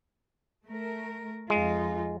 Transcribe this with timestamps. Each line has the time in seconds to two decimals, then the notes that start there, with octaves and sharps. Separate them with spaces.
0.66 A3 A#4
1.50 F2 G#3 D#4 F4